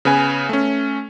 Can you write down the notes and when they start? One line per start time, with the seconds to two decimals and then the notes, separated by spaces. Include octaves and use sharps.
0.05 C#3 B3 B4 G#5
0.49 A3 C#4